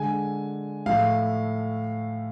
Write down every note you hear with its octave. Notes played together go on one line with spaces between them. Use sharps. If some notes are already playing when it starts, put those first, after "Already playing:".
Already playing: D3 G#3 G#5
A2 F3 A3 F5